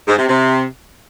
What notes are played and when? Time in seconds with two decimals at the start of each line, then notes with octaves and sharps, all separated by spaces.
0.08 G#2
0.18 C3
0.29 C3